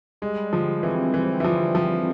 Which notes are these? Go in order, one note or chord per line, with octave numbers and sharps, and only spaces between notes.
G3 G#3
D3 F3
E3 C4
E3 C4
E3
D3 F3
F3 C4